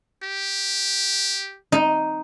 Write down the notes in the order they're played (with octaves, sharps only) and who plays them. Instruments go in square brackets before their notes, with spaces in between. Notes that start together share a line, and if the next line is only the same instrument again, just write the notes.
[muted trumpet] G4
[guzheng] D#4